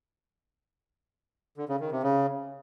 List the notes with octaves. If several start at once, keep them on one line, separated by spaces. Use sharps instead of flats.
D3
C#3
D#3
C3
C#3